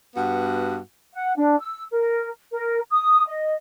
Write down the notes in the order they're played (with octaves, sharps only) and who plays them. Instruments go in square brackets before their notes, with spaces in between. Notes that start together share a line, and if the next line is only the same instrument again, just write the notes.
[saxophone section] G2 B3 F#4
[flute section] F#5
D4
E6
A#4
A#4
D#6
D#5